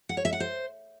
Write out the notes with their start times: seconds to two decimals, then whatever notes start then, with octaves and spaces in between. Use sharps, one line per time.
0.09 F#5
0.17 C#5
0.25 E5
0.33 F#5
0.40 C5